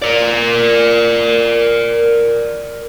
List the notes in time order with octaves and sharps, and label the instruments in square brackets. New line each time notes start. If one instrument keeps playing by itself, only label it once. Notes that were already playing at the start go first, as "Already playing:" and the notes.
[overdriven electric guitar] A#4 D5